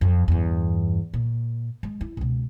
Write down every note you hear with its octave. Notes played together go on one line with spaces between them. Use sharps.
F2
E2 G2
A#2
G#3
E4
C#2 B2